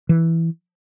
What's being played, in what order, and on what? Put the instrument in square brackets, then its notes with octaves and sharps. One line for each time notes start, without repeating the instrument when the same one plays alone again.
[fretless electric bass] E3